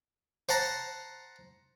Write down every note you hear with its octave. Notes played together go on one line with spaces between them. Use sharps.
C5 F#5 A5 A#5